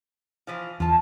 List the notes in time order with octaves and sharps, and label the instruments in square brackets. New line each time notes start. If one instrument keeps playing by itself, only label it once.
[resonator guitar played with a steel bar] E3 F3 F4
[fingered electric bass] E2 [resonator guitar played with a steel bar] F4 A5